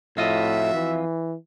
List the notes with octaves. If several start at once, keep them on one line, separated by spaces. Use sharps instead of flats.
F2 A2 F4 F#4 D#5 E5
E3